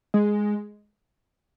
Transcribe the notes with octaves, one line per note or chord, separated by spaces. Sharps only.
G#3